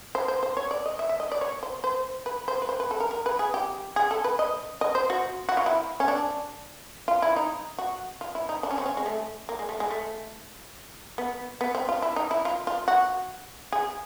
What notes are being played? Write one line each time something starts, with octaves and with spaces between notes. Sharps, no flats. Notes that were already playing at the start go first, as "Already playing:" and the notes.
C5
C5
C5
C#5
D5
D#5
E5
E5
D#5
D5
C#5
C5
C5
B4
C5
B4
C5
B4
A4
A#4
A#4
B4
G#4
G4
G#4
A4
B4
D#5
D#5
C5
F#4
F#4
F4
E4
C#4
D4
F4
E4
D#4
F#4
F4
E4
D#4
D4
C#4
C4
C#4
G#3
A3
A#3
G#3
A3
G#3
A3
B3
B3
C4
F4
E4
D#4
E4
F4
F4
F#4
G#4